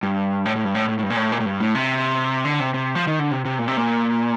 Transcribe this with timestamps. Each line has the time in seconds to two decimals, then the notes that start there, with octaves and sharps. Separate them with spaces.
0.03 G2
0.45 A2
0.56 A2
0.65 G2
0.75 A2
0.89 A2
0.99 A2
1.03 G2
1.10 A#2
1.17 A2
1.32 A#2
1.40 A2
1.46 G2
1.60 A2
1.75 C3
2.45 D3
2.60 C3
2.74 C3
2.95 F3
3.07 D#3
3.19 D3
3.31 C3
3.45 C3
3.59 A#2
3.68 C3
3.77 A#2